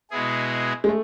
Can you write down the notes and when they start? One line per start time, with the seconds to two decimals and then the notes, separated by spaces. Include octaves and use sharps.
0.11 B2 G#3 B3 E4 G#4
0.84 G#3
0.88 A3